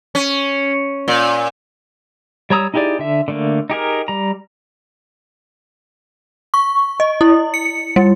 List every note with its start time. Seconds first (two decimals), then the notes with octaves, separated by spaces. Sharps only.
0.15 C#4
1.08 A#2
2.50 G3 C#5 A#5 D#6 E6
2.74 D#4 E4 G4 G#4 D5
2.99 D3 E5
3.28 D3 A3 A#3
3.70 D#4 G4 G#4 A#4
4.08 G3 A#5
6.54 C#6
7.00 D#5
7.21 E4
7.54 C#7
7.96 G3